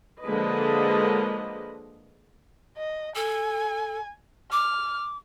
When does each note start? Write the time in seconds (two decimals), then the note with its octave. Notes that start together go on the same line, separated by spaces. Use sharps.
0.23 D3 F3 G#3 A#3 B4 D#5
2.78 D#5
3.16 A4 G#5
4.52 D6 F6